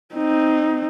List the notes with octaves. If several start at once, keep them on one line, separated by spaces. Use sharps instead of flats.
C4 D#4